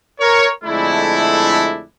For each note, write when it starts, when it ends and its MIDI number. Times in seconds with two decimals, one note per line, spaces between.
0.19 0.47 70
0.19 0.47 73
0.63 1.82 41
0.63 1.82 50
0.63 1.82 56
0.63 1.82 57
0.63 1.82 62
0.63 1.82 64